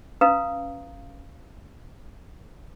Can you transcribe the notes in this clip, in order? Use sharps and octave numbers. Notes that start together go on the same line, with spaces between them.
C#4 B4 F5 A#5 D#6